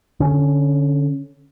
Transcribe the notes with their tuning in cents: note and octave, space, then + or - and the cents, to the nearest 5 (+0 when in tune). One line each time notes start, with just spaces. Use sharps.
D3 -10 C#4 +0